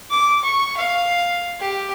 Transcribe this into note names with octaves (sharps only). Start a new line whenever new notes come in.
D6
C#6
F5
G4